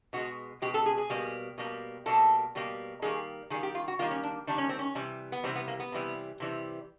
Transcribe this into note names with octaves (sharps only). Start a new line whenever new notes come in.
B2 G#3 F#4
B2 G#3 G4
A4
G#4
G#4
B2 G3 A#3
B2 G3 A#3
B2 G3 A#3 A4
B2 G3 A#3
D#3 G3 A#3 G#4
D#3 G3 A#3 G#4
G4
F4
F#4
D#3 G3 A#3 F4
C#4
D4
D#3 G3 A#3 D4
C#4
C4
C#4
C3 E3 G3
B3
C3 E3 G3 C4
B3
A#3
B3
C3 E3 G3
C3 E3 G3